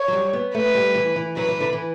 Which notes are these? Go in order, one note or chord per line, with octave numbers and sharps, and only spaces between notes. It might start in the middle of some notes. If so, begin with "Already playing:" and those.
Already playing: C#5
F#3
G3
B3
A3 B4
G3
E3
E3
F#3 B4
E3
D3
E3